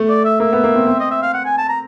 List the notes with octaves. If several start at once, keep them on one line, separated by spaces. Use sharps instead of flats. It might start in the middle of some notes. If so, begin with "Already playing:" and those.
Already playing: A3
D5
E5
A#3 E5
B3
A#3
C4
C4
D#5
E5
F5
F#5
G#5
A5
A#5